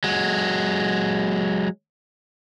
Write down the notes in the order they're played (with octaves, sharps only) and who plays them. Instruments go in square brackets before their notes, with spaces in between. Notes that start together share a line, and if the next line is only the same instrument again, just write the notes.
[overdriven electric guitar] F#3 G#3